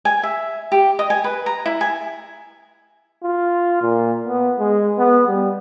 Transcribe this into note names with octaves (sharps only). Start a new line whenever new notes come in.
G#5
E5
G4
D#5
G#5
B4
A#5
E4
G#5
F4
A#2
B3
G#3
B3
G3